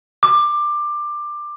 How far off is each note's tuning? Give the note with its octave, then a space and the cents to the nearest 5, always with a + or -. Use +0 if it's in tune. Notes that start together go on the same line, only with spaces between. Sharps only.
D6 +15